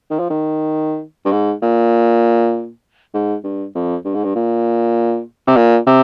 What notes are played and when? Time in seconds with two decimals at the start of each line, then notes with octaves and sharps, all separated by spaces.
0.10 D#3
0.19 F3
0.30 D#3
1.25 G2
1.31 G#2
1.62 A#2
3.14 G#2
3.44 G2
3.75 F2
4.04 G2
4.15 G#2
4.24 G2
4.35 A#2
5.47 C3
5.56 A#2
5.87 C3